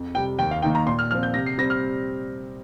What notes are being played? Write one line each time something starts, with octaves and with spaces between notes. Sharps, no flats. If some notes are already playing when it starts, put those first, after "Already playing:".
Already playing: F2
C3 G3 G5
D#2 G5
F5
D#3 A#3 D#4 G5
A#5
A#2 C6
F6
F3 C4 F6
G6
C3 A#6
C7
G3 C4 A#6
F6